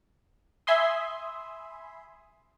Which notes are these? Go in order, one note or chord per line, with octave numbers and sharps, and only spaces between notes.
E5 G#5 B5 C6 D#6